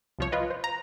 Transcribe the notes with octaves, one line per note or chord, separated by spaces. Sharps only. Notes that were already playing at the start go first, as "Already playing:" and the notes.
C2 F3 C#5
F4 B4 D#5
C5
A#5